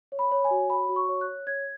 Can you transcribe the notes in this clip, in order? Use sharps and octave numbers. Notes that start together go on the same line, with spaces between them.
C#5
B5
C#5
G#5
F#4
C#5 B5
F#4
C#6
C#5
F#6
C#5
C#5 G#6